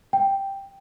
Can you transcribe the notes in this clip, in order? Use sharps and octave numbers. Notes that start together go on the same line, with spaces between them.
G5